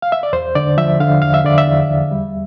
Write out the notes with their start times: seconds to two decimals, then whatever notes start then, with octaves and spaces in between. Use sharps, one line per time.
0.02 F5
0.12 E5
0.23 D5
0.33 E2 C5
0.55 D3 D5
0.77 F3 E5
1.00 D3 F5
1.22 E2 F5
1.34 E5
1.44 D3 D5
1.58 E5
1.66 E2
1.89 E2
2.11 G3